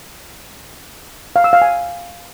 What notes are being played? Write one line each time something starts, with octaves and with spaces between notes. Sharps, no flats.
F5
E6
F5
G#5